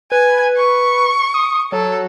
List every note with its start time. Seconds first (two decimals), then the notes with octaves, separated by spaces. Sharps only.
0.12 B4 G#5
0.56 C#6
1.34 D#6
1.72 F#3 A4